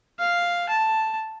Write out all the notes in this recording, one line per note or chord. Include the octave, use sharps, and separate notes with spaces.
F5
A5